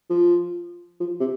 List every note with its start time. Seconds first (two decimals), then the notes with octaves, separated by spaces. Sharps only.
0.10 F3
1.00 F3
1.20 C3